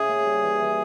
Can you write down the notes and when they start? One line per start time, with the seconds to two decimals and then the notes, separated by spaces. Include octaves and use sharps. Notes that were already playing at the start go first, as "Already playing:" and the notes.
Already playing: C#3 E4 G#4
0.09 A#3
0.25 G3
0.42 E3
0.60 E3